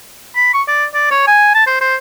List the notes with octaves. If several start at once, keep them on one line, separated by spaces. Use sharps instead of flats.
B5
C#6
D5
D5
C#5
G#5
A5
C5
C5